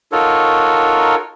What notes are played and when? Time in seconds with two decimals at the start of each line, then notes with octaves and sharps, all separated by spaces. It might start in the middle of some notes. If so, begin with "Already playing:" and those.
0.12 D#4 F4 F#4 A4 A#4 C#5